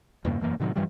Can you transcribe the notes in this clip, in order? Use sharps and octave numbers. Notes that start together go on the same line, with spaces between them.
E2 G2 C#3 A#3
E1 F#2 E3 A#3
A2 C3 D#3 F#3
G2 E3 F3 G3